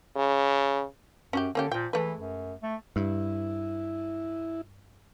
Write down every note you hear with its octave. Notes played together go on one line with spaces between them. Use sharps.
C#3
F#2 C#4 F#4 G4
D3 A#3 C#4 G4
A#2 F3 G5
E3 G#3 A3 B4
F#2
A3
G2 E4